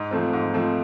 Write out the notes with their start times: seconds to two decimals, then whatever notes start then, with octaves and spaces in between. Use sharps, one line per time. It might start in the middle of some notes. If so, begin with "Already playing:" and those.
Already playing: G#2
0.11 F3 A3 C4
0.33 G#2
0.54 F3 A3 C4